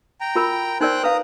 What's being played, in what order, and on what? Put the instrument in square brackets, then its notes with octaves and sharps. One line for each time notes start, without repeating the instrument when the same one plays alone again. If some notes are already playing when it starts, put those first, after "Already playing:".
[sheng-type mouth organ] G5 A#5
[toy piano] F4 A#4 B5
[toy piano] D#4 A#4 D5 [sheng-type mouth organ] C5 G5 F#6
[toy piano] B4 F5 [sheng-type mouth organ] A#5 D#6